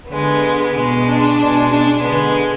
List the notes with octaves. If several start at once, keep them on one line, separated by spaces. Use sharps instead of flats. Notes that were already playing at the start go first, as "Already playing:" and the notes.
D3 G#3 B3
B2 G#3
D4
B2 G#3
D4
D3 G#3 B3